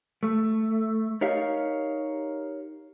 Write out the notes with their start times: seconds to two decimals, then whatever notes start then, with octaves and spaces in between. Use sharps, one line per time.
0.23 A3
1.21 D#4 G4 A#4 C#5 D#5 F5